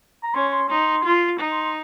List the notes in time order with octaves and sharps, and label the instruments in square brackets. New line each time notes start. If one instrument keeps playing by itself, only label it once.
[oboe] A#5
[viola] C#4 [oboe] C6
[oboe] C6
[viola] D#4 [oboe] C6
[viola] F4
D#4
[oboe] C6
C6